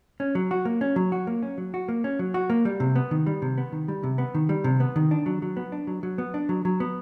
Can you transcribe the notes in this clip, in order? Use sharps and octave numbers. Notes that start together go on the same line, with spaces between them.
C#4
F#3
F#4
A#3
C#4
F#3
F#4
A#3
C#4
F#3
F#4
A#3
C#4
F#3
F#4
A#3
G3
C3
B3
D#3
G3
C3
B3
D#3
G3
C3
B3
D#3
G3
C3
B3
D#3
D4
F#3
F#3
B3
D4
F#3
F#3
B3
D4
F#3
F#3
B3